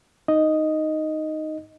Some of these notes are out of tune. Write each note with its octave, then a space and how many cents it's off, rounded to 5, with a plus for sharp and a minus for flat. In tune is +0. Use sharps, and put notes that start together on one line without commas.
D#4 +0 D#5 +0